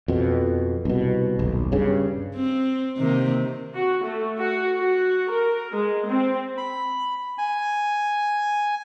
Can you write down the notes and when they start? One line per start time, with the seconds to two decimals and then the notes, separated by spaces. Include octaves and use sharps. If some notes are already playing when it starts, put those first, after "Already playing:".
0.08 F2 B2
0.85 C2 B2
1.39 D#1 B1
1.72 G2 C#3
2.35 C4
2.98 C3 D#3 A#3
3.75 F#4
4.04 A3
4.36 F#4
4.77 F#4
5.30 A#4
5.74 G#3
6.07 C4
6.57 B5
7.38 G#5